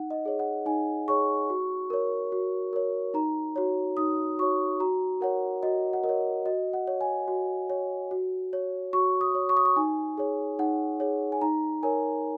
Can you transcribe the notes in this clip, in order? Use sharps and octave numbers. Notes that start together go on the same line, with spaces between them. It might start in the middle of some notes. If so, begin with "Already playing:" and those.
Already playing: D#4 F#5
D#5
G#4 C#5
F#5
D#4 G#5
G#4 C#5 C#6
F#4
A#4 C#5
F#4
A#4 C#5
D#4 A#5
F#4 C#5
D#4 D#6
F#4 C#5 C#6
F#4 A#5
A#4 C#5 F#5
F#4 D#5
F#5
A#4 D#5
C#5
F#4 D#5
F#5
C#5
G#5
F#4
C#5
F#4
C#5
F#4 C#6
D#6
C#5
C#6
D#6
C#6
D#4 G#5
G#4 C#5
D#4 F#5
G#4 C#5
G#5
D#4 A#5
A#4 C#5 G#5